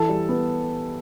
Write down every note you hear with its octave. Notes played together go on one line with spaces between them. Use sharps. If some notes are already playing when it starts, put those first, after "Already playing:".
Already playing: E3 A4
G3
B3